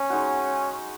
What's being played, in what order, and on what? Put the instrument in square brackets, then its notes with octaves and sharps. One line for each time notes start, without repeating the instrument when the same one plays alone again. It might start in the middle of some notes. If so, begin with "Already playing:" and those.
Already playing: [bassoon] C#4
[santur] G#3 D#4 F#4